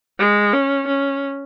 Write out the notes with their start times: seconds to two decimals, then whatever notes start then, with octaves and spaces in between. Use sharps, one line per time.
0.19 G#3
0.53 C#4
0.88 C#4